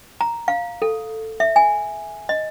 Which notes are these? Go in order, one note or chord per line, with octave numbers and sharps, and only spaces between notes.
A#5
F5
A4
E5
G#5
D#5